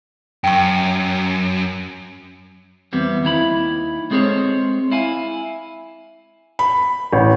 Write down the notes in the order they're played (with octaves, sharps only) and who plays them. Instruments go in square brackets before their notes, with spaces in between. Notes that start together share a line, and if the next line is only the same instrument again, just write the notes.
[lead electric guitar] F#2 [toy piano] G5 C#6
[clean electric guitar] E2 G3 B3 C4
D#2 D#3 E4 A#5 B5
G#3 C4 G#4 A4 C5 C#5
E4 F5 G#5
[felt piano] B5
A1